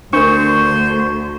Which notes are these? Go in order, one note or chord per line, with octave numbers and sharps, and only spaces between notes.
D2 D4 A#4 C5 C#6